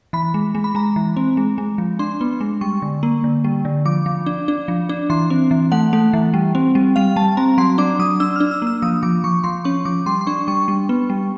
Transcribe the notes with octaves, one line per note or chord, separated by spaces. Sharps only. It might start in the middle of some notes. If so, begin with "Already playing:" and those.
E3 B5
G#3
G#3
B5
G#3 A#5
E3
C4
G#3
G#3
F3
D4 C6
B3
G#3
G3 C#6
D3
A#3
D3
G3
D3
F3 D6
F3
D4
D4
F3
D4
E3 C6
C4
E3
A3 F#5
A3
E3
G3
C4
G3
G3 F5
G3 A5
C4 A#5
F#3 C6
D4 D6
F#3 D#6
D4 E6
D4 F6
E6
A#3 E6
F3 D#6
F3 D6
F3 C#6
F3 C6
C#4 C#6
F3 D6
G3 C6
C6
D4 C#6
G3 C#6
G3
B3
G3